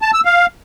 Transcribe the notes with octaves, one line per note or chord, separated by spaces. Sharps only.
A5
E6
F5